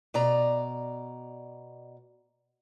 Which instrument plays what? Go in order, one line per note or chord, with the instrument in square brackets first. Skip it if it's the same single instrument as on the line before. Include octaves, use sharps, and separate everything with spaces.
[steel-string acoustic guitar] B2 D5 A#5